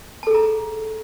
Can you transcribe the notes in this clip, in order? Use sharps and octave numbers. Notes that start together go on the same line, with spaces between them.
G#4 A4 A5 A#5